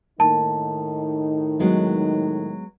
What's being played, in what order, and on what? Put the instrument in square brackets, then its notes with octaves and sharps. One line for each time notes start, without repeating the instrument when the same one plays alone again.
[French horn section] A2 D#3 D#4 [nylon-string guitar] A#3 [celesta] A5
[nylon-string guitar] F#3 G#3 B3